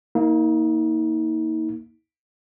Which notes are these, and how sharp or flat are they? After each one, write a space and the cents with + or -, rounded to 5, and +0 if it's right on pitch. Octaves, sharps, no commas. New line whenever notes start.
A#3 +0 D#4 +40